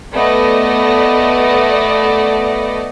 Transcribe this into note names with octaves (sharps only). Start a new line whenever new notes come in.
A3 B3 D5 D#5